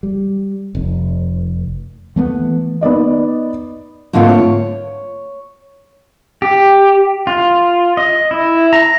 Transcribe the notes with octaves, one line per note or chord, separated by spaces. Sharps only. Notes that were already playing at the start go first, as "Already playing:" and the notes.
G3
F1
E3 A3 B3
B3 D#4 D5 D#5
G#2 D3 A3 A#3 C4 F4
C#5
G4
F4
D#5
E4
A#5